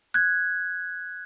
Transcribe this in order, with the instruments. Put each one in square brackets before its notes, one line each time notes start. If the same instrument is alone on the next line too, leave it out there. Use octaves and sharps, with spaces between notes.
[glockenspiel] F#6 G#6